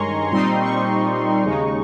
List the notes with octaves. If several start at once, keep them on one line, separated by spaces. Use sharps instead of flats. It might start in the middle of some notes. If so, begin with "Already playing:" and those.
Already playing: G2 D#3 G#3 C#4 G#5 A#5 C6 C#6
A#2 G3 C4 D#4 C6
C#6
D#2 C#3 G#3 D#4